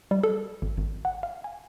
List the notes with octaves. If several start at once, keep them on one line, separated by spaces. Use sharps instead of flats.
G3
A4
G#1
G#1
F#5
F5
G#5